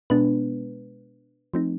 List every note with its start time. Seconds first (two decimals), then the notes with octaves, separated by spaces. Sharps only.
0.10 B2 G#3 B3 D4 B4
1.54 F3 A3 C4 D#4